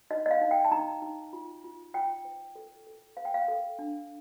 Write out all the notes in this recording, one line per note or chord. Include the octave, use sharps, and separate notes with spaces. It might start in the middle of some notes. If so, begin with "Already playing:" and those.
D#4 D#5
D#5
F5
D#4
G5
A5
D#4 A#5
D#4
F4
F4
F4 G5
C5
A4
A4
C5 F5
G5
F5
A4
D4